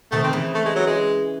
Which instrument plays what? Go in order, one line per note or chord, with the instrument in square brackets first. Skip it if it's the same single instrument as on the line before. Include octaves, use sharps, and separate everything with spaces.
[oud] C3 D#3 [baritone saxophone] A3
[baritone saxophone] C4
[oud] C#3 E3
[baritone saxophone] A3
G#3
F#3
G#3